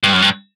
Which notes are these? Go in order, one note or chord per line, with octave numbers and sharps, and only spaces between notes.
G2
F#2
G2